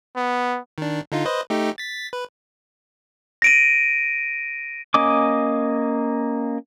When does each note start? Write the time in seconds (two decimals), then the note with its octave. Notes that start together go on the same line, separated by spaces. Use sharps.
0.16 B3
0.78 D#3 D4
1.12 D3 D#4 F4
1.25 B4 C5 D#5
1.50 A3 D#4 G4
1.78 A6 B6
2.13 B4
3.42 A#6 D7 D#7
4.94 A#3 C#4 D#5 G#5 D6